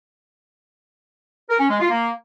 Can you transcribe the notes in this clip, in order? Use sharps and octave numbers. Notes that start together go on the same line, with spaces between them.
A#4
C#4
G#3
F4
A#3